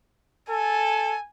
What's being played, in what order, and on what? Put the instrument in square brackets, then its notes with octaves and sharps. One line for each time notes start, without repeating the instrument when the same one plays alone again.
[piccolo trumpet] A4 [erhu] G#5